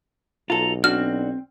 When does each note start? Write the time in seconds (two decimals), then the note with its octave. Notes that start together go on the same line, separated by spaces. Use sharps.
0.50 B1 F4 A4 A#5
0.84 C4 D4 F#4 F6